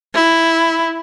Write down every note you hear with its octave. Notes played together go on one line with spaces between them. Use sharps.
E4